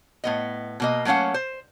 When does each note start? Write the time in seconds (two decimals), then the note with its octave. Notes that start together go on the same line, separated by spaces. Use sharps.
0.24 A2 B3 D#5
0.80 B2 A#3 D#5
1.05 F#3 A3 A#3 C#4 F5 F#5
1.34 C5